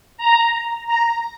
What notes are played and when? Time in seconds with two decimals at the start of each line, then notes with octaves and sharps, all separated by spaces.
0.17 A#5
0.87 A#5